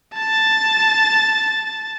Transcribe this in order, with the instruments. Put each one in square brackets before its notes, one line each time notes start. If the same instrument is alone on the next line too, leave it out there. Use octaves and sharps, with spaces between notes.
[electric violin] A5 A6